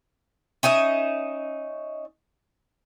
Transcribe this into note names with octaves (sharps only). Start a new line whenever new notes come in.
C#4 D#4 D#5 E5